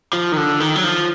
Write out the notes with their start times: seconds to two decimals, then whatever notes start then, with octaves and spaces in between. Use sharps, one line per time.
0.13 F3
0.32 D#3
0.37 D3
0.60 D#3
0.75 F#3
0.84 F3